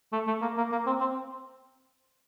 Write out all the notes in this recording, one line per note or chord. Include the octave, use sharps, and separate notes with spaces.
A3
A3
A#3
A#3
A#3
C4
C4